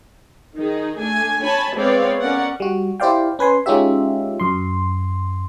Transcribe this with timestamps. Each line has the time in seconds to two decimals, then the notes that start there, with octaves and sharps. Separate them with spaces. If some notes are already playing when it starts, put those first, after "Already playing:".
0.56 D#3 D#4 G#4
0.97 A3 D4 G#5
1.43 C#5 G#5 A5 B5
1.75 G#3 B3 C4 C#5 D5 F5
2.20 C#4 A#4 D5 F#5
2.60 G3 F#4
3.00 E4 G4 C5 D5 F5 G5
3.39 C#4 B4 G#5 C6
3.66 G#3 C#4 D#4 F4 G4 E5
4.40 F#2 C6